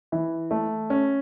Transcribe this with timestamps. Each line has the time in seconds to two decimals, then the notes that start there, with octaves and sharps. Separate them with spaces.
0.12 E3
0.51 A3
0.90 C#4